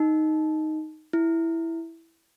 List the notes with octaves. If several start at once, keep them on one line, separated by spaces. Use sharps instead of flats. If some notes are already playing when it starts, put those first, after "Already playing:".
Already playing: D#4
E4